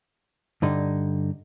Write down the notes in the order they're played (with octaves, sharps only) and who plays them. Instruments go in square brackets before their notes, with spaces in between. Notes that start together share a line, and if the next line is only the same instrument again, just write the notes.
[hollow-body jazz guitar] G2 D3 D#4